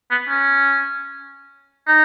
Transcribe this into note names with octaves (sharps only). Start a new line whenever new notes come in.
B3
C#4
D#4